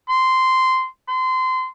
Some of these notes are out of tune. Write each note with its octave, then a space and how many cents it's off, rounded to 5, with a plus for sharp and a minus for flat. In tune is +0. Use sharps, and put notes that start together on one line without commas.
C6 -10
C6 -25